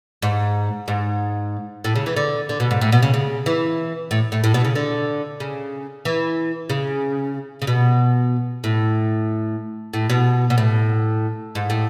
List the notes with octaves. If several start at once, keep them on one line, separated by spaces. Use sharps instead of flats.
G#2
G#2
A2
C#3
E3
D3
D3
B2
G#2
A2
B2
C#3
C#3
E3
A2
A2
A2
B2
C#3
D3
C#3
E3
C#3
C#3
B2
A2
A2
B2
B2
A2
G#2
A2